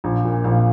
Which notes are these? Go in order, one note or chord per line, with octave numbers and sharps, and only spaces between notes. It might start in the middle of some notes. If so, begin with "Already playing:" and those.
A#1
A#2
A#1 F5